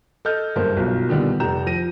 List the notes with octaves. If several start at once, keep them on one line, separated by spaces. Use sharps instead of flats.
A4 D#5 F6 G6
F#1 G2 A#3 C5
B1 F4
A#2 D3 D#3 G3 B3
F1 A#5 G6 E7
F3 A#6 D#7